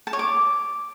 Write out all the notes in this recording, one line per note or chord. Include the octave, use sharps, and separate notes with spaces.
A5
C#5
D6